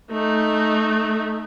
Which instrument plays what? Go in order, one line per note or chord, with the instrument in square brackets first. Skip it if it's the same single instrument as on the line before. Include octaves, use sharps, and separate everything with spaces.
[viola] A3 D#4